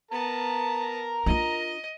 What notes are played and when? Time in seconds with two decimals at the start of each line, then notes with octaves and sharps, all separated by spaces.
0.11 B3 A#4 A5 A#5
1.26 D4 F4 D#5